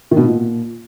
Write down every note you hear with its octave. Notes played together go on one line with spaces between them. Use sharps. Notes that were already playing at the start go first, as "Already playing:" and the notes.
D#3
B2
A#2